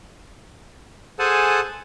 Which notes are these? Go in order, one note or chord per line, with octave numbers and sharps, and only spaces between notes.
G#4 A4 C5 F#5 G#5 A5